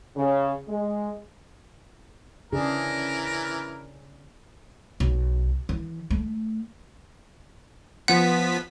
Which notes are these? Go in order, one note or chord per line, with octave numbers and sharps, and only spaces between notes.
C#3
G#3
C#3 E3 D4 G#4 A#4
B1
E3
A3
F3 B3 F#5 B6